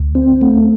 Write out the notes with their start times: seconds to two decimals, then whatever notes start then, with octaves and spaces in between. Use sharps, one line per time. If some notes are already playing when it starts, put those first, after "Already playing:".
Already playing: D2
0.15 C4
0.41 A3